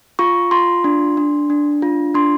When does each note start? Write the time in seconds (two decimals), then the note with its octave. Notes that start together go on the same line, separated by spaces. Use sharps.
0.19 F4 C#6
0.51 F4 C6
0.84 D4
1.17 D4
1.50 D4
1.82 F4
2.14 D4 C6